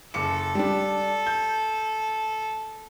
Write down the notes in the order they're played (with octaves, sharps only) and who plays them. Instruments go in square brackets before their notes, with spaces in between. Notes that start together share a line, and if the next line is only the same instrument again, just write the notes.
[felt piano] F#1 D6 C#7 [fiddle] A4
[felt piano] G3 D4
G6